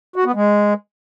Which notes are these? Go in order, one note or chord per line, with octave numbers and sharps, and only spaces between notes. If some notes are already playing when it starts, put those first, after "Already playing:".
F#4
B3
G#3